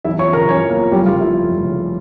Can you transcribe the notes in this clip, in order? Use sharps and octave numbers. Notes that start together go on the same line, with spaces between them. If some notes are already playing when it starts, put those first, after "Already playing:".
E2 E4 E5
F3 C#5 C#6
C#3 A#4 A#5
E2 C#4 C#5
E2
A#3 A#4
F3
F1 G3 G4
C#3 F4
F2 E4
F1
F1
C#3